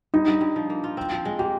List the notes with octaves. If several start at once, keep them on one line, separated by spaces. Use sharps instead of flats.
G2 D#4
G2
G2
F3
A#3
F4
C4
F3
G#3
A#3 G4